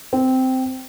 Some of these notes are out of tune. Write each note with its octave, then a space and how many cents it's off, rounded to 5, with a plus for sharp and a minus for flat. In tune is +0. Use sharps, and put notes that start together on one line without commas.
C4 -10